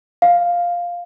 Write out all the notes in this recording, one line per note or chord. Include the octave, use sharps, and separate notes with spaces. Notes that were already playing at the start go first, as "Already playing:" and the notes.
F5